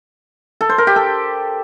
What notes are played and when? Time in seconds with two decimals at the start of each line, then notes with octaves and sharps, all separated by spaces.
0.61 A4
0.69 C5
0.78 A#4
0.87 G4
0.96 A4